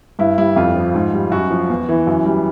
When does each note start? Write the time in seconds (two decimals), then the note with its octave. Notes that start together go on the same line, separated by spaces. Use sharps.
0.19 G2 E4
0.38 G3 E4
0.56 F2 F4
0.76 F3
0.94 G#2
1.13 G3
1.32 F#2 F#4
1.51 F3
1.70 E2
1.89 E3
2.07 F#2
2.26 G3